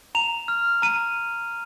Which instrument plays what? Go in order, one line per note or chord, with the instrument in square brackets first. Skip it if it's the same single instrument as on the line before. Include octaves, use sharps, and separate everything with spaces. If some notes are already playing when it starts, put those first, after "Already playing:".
[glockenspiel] A#5 F7
F6
A#5 D#7